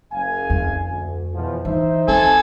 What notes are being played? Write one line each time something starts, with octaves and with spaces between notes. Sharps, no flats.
F#1 F5 G#5
F2
D2
E2 B2 F3
E3 D#4 C5 E5
C4 A4 G#5